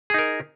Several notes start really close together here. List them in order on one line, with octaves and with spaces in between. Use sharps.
G#4 D#4 A#4